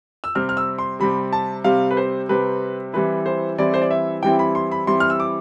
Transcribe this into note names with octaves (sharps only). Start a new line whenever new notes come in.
E6
C3 G3 C4 F6
F6
E6
C6
C3 G3 C4 B5
A5
C3 G3 C4 F5
B4
C5
C3 G3 C4 B4
E3 G3 C4 E4 B4
C5
E3 G3 C4 E4 D5
C5
D5
E5
E3 G3 C4 E4 G5
B5
C6
B5
E3 G3 C4 E4 C6
F6
E6
D6